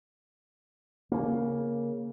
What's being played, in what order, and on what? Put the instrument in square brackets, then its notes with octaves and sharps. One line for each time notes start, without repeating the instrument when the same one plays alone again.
[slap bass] C#3 A#3